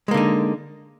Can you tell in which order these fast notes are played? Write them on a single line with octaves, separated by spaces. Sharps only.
G#3 A#3 D3 D#4